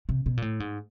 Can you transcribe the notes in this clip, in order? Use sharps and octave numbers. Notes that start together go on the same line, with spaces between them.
C3
B2
A#2
A2
G#2